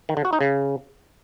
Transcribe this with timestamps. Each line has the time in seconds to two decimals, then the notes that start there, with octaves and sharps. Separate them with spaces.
0.09 D#3
0.17 D3
0.25 F#4
0.33 D#4
0.41 C#3